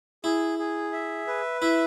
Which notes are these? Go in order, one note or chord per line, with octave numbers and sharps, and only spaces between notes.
E4 G#4
G#4
E5
B4
E4 E5